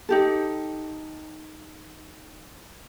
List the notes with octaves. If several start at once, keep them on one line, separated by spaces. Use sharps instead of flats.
D#4 G4 A4